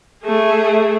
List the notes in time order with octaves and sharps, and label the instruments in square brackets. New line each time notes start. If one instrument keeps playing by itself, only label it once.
[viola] A3 G#4